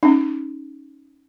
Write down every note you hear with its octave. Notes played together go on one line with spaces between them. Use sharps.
C#4 D#4